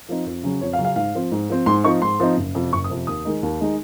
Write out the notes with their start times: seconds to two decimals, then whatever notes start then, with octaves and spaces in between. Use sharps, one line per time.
0.09 F3 C4 D#4
0.26 F2
0.43 C#3 F#3 C#4
0.61 F2 C#5
0.73 F5
0.79 C#3 F#3 C#4
0.85 F5
0.96 G#2 F5
1.15 F3 C4
1.32 G#2
1.49 F3 C4
1.66 G#2 C6
1.84 F3 C4 D#4 C#6
2.02 G#2 C6
2.20 F3 C4 D#4
2.37 F#1
2.55 F2 C3
2.73 F#1 C#6
2.84 D#6
2.90 F2 C3
3.07 D#2 D#6
3.25 D#3 G#3 D#4
3.43 D#2
3.61 D#3 G#3 D#4